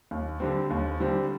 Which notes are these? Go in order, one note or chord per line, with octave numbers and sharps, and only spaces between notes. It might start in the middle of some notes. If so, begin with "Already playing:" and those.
D#2
D3 G3 C4
D#2
D3 G3 C4